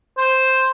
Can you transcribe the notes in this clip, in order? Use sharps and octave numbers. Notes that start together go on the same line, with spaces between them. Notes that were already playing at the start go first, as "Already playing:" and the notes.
C5